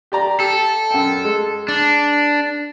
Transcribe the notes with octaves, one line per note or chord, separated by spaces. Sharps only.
G4 D5 A#5
G4 A4
F#2 G5
G#3
D4